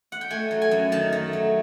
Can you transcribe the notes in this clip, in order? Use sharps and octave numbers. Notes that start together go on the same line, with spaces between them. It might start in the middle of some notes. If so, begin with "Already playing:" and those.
F#5
G5
A3 G#5
F#3
G#5
F#2
D#3 A5
A3
F#3